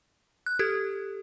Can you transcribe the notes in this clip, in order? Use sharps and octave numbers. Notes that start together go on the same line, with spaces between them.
F#6
G4 A4 G#6